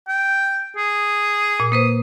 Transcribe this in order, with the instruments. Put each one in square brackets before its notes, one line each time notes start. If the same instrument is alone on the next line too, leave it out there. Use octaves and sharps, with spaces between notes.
[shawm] G5
G#4
[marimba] A#2
[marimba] A#3 B4 C5 [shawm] D#6